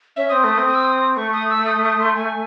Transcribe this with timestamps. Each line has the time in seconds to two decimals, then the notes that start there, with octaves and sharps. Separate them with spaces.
0.16 C#4 E5
0.29 C4 D#6
0.43 A3 D#6
0.54 D#6
0.58 C4
0.67 D#6
0.75 E6
0.84 D#6
1.16 A3 C#6
1.33 D#6
1.50 E6
1.66 D#6
1.84 D#6
2.00 C6
2.16 G#5